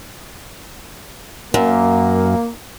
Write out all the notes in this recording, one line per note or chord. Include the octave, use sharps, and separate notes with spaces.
F#2 A#3